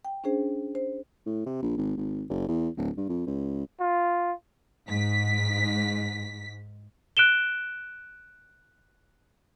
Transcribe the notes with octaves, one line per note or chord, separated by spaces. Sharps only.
G5
C#4 D4 G#4 C5
C5
A2
C3
A#1
G#1
G#1
F#1
E2
D1
G2
F2
C#2
F4
G#2 B6
F#6 D7 E7 G7